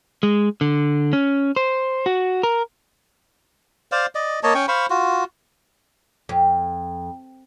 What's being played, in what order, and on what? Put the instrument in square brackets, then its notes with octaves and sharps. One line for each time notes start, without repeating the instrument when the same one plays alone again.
[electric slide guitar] G#3
D3
C#4
C5
F#4
A#4
[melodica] C5 D5 F5
D5 D#5
A#3 C#5 D#5 A5
C#4 G5 C#6
C5 F5 B5 C#6
F4 F#4
[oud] F2